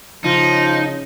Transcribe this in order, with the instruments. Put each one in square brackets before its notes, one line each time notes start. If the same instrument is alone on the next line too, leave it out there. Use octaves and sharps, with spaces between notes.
[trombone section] C#3 [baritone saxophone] F3 [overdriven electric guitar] D#4